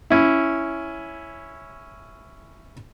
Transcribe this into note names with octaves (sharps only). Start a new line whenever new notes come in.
C#4 E4